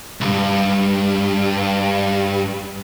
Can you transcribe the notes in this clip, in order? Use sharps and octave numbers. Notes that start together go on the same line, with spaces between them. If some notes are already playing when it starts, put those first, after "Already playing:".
C2 G2